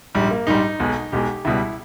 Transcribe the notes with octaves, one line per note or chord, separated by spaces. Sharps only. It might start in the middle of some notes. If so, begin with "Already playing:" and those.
A#1 G#2 G3
A#3
A#1 G#2 G3 D#4
B1 B2 G#3
B1 B2 G#3 G4
C#2 B2 G3 E4